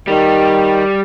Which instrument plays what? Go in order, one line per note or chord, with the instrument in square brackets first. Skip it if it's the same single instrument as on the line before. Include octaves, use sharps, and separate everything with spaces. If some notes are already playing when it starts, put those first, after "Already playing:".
[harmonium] D#3 [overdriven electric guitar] G3